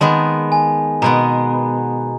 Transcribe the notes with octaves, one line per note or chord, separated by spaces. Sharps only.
D#3 G#3 B3 A5
G#5
B2 G#3 B3 A#5